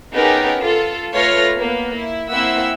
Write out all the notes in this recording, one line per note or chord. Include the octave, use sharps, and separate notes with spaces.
B3 C#4 D#4 G4 G#4 A#4
F4 A4
A3 F4 B4 C#5 F6 A#6
A#3 B3
E4
A#3 C4 E4 E5 F#5 E6